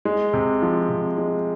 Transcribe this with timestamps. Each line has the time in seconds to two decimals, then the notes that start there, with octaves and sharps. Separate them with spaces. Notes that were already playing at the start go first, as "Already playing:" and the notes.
0.05 G#3
0.33 C3
0.62 F3
0.90 C3
1.18 G#3